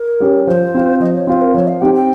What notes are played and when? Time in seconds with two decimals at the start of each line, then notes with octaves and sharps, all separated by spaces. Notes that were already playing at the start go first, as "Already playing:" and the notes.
Already playing: A#4
0.20 G3 C#4 G4
0.47 F3 C5
0.75 C4 F4
1.00 F3 D#5
1.14 C#5
1.27 C4 F4 C5
1.41 A#4
1.54 F3 C#5
1.68 F5
1.81 C4 D#4 G4 G5
1.95 G5